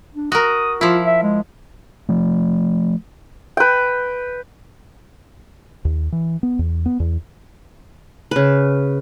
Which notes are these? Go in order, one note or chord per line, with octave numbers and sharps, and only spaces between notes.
D4
F#4 A#4 D#6
F3 E4 F4
E5
G#3
F3 A3
B4 G5
D#2
E3
B3
E2
B3
E2
C#3 B4